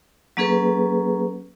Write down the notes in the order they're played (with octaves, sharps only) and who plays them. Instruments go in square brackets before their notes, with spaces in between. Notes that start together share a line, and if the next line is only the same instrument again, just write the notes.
[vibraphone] F#3 A#3 C#4 G#4 A4 B4